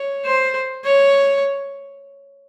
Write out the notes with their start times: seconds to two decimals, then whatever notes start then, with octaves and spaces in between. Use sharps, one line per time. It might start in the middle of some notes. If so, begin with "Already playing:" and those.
Already playing: C#5
0.25 C5
0.85 C#5